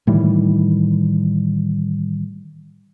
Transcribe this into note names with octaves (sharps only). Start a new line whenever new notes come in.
A2 D#3 E3 G3